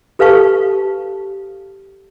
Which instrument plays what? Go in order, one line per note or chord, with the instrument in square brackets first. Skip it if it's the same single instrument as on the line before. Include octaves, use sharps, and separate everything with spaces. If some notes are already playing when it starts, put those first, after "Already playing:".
[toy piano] G4 A4 B4 F5 A5 C#6